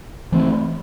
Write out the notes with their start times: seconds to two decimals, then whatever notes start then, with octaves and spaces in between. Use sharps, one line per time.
0.32 E3 A3 C4